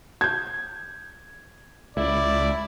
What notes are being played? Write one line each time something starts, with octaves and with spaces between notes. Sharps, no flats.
G6 G#6
C#2 E4 D5